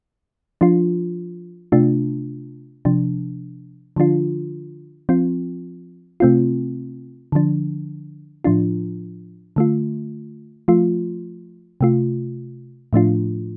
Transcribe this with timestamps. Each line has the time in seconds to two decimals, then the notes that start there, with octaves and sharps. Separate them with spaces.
0.61 F3 D4 F4
1.72 C3 A3 D4 F4
2.85 C3 F3 D4
3.96 D3 F3 D4 F4
5.09 F3 C4 F4
6.20 C3 A3 C4 F4
7.32 D3 F3 D4
8.44 A2 F3 D4 F4
9.56 D3 A3 F4
10.68 F3 A3 F4
11.81 C3 A3 F4
12.93 A2 F3 A3 D4 F4